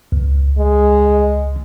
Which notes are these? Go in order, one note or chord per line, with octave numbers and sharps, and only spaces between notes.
C#2
G#3